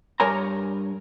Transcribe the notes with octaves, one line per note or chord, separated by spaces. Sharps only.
G2 A#4 C#5 G#5 A#5